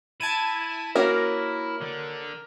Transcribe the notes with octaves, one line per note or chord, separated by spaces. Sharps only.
E4 A5 G#6 D#7
A#3 C#4 F#4 A#4
D3